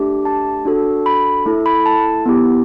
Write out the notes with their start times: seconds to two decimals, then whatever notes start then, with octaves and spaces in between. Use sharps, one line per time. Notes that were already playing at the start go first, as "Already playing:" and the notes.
Already playing: A3 D4 G4
0.25 A5
0.65 D4 F#4 A4
1.06 B5
1.45 A3 E4 A4
1.66 B5
1.86 A5
2.26 B3 E4 G4